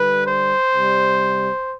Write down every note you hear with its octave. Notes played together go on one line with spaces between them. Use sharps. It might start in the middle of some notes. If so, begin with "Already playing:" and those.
Already playing: D3 G3 B4
C5
C3 G3